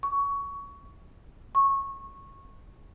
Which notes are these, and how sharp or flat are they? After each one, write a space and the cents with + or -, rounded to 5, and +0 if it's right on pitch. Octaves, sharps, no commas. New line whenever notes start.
C#6 +15
C#6 -15